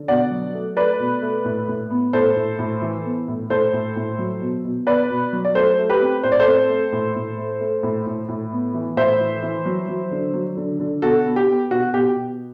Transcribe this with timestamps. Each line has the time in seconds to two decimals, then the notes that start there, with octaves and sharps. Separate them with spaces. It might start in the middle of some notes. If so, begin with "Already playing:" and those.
Already playing: D3
0.08 B2 D5 F#5
0.31 F#3
0.54 A3
0.77 A3 B4 D5
0.99 B2
1.22 A3
1.45 A2
1.68 A2
1.90 B3
2.13 A2 A4 C5
2.36 A2
2.59 A2
2.82 E3
3.05 B3
3.28 A2
3.50 A2 A4 C5
3.73 A2
3.96 A2
4.19 F#3
4.41 B2
4.64 B2
4.87 B3 B4 D5
5.10 B2
5.33 F#3
5.45 D5
5.55 A3 A4 C5
5.78 A3
5.89 G4 B4
6.01 C4
6.23 A2 C5
6.32 D5
6.40 A4 C5
6.46 C4
6.69 A3
6.92 A2
7.15 A2
7.38 A3
7.60 A3
7.83 A2
8.06 A2
8.29 A2
8.52 B3
8.74 E3
8.97 A2 C5 E5
9.20 E3
9.43 E3
9.65 F#3
9.88 F#3
10.11 D3
10.34 F#3
10.57 D3
10.80 D3
11.02 B2 F#4 A4
11.25 B3
11.36 G4
11.48 B3
11.70 B2 F#4
11.93 B2 G4
12.16 B2